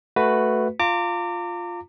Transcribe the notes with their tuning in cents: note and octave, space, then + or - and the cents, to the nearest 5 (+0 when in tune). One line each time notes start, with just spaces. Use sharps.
A3 +0 F#4 +0 B4 +5
F4 +0 A#5 -35 D6 +0